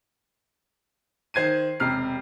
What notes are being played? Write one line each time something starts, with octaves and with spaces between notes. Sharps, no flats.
D#3 C5 G#6 C7 D#7
E1 C3 F6 C7